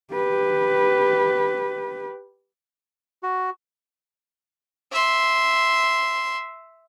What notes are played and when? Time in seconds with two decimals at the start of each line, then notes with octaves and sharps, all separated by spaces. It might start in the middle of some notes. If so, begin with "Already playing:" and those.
0.13 G4 B4
3.23 F#4
4.92 E5 C6